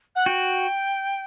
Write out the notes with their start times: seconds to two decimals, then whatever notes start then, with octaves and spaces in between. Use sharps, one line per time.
0.15 F#5
0.26 F#4 G5